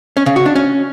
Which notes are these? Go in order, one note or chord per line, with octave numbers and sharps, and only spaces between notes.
C#4
C#3
F#4
D4
C#4